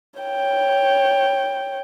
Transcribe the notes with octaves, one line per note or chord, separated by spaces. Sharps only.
C#5 G5